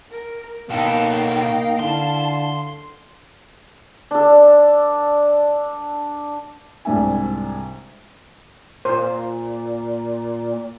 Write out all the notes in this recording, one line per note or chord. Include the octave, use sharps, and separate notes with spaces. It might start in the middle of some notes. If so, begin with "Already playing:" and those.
A#4
B2 A#3 D#4 A4 F5 G5
D3 E4 A5 C6
D4 A4
C2 G#2 D4 E5 G#5
A#2 C5